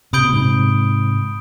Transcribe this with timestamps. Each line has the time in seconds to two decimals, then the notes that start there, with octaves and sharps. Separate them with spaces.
0.13 C3 B5 D#6 G6 D7 G7
0.23 B2
0.33 G#2 C3